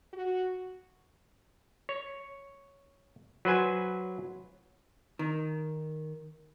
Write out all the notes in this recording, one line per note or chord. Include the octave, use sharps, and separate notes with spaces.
F#4
C#5
F#3 B4 C5 G#5
D#3